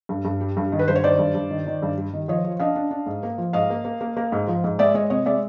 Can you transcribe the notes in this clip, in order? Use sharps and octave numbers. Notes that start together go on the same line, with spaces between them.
G2
G2
G3
G2
D#3
B4
G2 C5
C#5
D#3 C5 D5
G2
G2
D#3
D#3
G2
G3
D#3
F3 C#5 D#5
F3
D4 D#5 F5
D4
D4
G#2
A#3
F3
G#2 D#5 F5
A#3
A#3
A#3
A#3
G#2
F3
G#2
G#3 D5 E5
G#3 C#5 D#5
C3 C#5 D#5
G#3 D5 E5